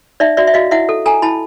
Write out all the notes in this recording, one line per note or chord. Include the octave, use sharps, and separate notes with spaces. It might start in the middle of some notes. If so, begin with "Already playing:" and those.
D#4 D5 E5
F#4 D5 E5
E5
F#4 D#5 F5
E4 E5 F#5
A4
A4 G#5 A#5
E4 A5 B5